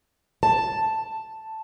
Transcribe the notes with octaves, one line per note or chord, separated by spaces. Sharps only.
A5